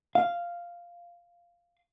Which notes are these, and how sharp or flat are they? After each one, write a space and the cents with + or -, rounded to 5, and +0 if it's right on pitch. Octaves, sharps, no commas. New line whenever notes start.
F5 -5